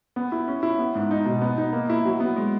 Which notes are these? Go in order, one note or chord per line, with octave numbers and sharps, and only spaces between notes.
B3
E4
C#4
E4
B3
G#2
D#4
B2
B3
D#4
A#3
E4
F#3
B3
G#3